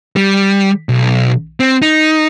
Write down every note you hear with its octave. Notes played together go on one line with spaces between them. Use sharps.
G3
B1
C4
D#4